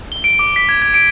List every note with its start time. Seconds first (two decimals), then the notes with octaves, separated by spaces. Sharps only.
0.12 G7
0.24 D7
0.39 D6
0.56 B6
0.69 G#6
0.82 G#6
0.94 D7